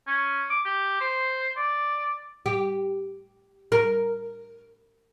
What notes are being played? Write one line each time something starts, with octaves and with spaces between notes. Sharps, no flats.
C#4
D6
G4
C5
D5
G4
A#4